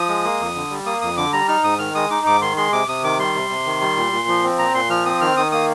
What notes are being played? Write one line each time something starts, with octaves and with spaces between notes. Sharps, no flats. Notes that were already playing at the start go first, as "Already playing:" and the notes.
Already playing: F3 D#6
G#3
A#3
F2
D3
G3
A#3 D#6
F2 D#6
D3 D6
G3 A#5
D#4 F6
G#2 D#6
D#3 F6
G#3 D#6
D#4 D6
G#2 D6
D#3 C6
G#3 C6
C3 D6
C3 D#6
D#3 D6
G3 C6
C3
C3
D#3
G3
A#2
A#2
F3
C4
A#2 A#5
A#2 C6
F3 F6
C4 D#6
D#3 F6
D#3 D#6
A#3 D#6